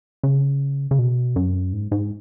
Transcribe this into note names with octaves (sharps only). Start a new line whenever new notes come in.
C#3
C#3
B2
F#2
G#2
G#2